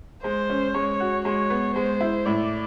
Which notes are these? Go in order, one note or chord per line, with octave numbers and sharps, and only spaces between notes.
G#3 C5
C#4
G#3 C#5
F#4
G#3 C#5
B3
G#3 C5
E4
A2 D5